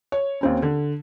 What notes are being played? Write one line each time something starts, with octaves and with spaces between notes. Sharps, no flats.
C#5
D#2 C4 C#4
D3